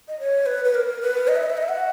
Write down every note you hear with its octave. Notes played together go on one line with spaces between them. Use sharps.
D#5
C#5
B4
B4
A#4
B4
D#5
E5
D#5
E5
D#5
E5
F#5